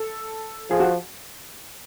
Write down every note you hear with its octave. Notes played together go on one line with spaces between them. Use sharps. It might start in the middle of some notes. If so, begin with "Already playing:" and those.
Already playing: A4
F3 G#4
F#4